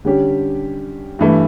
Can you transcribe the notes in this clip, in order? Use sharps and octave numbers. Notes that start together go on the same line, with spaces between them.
D3 G3 C#4 G4
G2 E3 A3